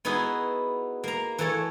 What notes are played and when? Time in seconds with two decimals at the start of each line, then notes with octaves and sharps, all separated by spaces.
0.05 B3 D#4 E4 F#4 G#4
1.04 A#3 A#5
1.38 E3 A3 A4 C#5